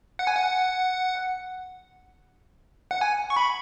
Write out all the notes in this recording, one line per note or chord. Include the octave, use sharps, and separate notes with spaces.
F#5
G#5
F#5
F#5
G#5
C#6
B5